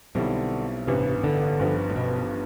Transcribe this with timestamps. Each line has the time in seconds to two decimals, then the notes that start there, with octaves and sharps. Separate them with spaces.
0.15 B1 B2 D3 G3 C4 E4
0.87 A1 G2 C3 E3 B3
1.24 D3
1.59 G1 G2 F3 B3
1.90 A2
1.96 B2